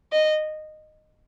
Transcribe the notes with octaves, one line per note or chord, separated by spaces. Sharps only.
D#5